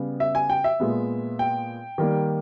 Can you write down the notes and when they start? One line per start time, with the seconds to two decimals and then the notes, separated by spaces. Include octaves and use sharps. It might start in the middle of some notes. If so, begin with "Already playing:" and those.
Already playing: C#3 G3 B3
0.20 E5
0.35 G#5
0.50 G5
0.64 E5
0.80 A#2 G#3 B3
1.39 G5
1.98 D#3 G3 A#3